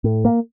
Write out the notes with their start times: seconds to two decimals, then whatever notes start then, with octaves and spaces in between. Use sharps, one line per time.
0.04 A2
0.25 A#3